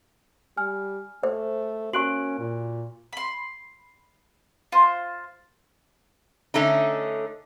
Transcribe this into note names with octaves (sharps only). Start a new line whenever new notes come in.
G3 G#5 F6
A3 C5
A#3 C#4 F#4 C#6 F#6 D7 F#7
A#2
B5 C6
F4 C5
D3 A3 C#4 D#4